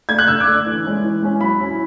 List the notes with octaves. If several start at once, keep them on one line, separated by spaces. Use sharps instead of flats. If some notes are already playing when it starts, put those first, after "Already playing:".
A3 D4 G#6
F#6
D3 E6
D6
A3 D4
E3
G#3 C#4 E4
E3
G#3 C#4 E4
F#3 B5
C#4 E4